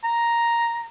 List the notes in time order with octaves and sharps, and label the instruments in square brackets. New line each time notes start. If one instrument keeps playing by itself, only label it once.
[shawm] A#5